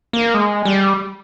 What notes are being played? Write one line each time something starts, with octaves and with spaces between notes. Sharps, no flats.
A#3
G#3
G3